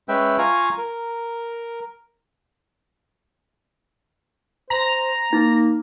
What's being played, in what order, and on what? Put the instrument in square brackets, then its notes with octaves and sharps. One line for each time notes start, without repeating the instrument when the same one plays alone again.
[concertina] G#3 C#4 B4 E5 G5
F4 F5 G#5 A#5 C#6
A#4
[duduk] C5 [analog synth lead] A#5
[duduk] A#3 [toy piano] D#4